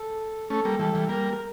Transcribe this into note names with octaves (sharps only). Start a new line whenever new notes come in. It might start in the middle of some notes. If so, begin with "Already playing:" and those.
Already playing: A4
A3 C#4 A4
G3 A#3
E3 G3 A4
E3 G3
G3 A#3 A#4